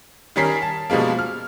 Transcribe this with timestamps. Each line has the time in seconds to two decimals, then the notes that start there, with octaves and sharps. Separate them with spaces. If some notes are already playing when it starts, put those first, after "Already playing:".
0.36 D#3 G3 C#4 A#4 B6 C7
0.62 A5
0.90 B2 F3 G3 G#3 A#3
1.19 F6